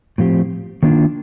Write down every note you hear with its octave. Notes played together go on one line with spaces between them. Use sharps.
A2 F3 C4 G4
D#3 A#3 D4 F4